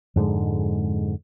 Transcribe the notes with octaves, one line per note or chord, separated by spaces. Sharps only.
F2 G#2 D3 G#3